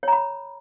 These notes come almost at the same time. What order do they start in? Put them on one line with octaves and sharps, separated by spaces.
C#5 A#5 B5